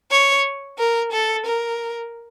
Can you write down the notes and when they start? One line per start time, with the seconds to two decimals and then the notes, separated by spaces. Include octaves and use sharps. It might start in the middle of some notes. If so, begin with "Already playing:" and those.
0.11 C#5
0.78 A#4
1.12 A4
1.46 A#4